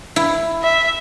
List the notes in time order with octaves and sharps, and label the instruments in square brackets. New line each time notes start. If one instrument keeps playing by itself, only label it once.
[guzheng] E4
[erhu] E5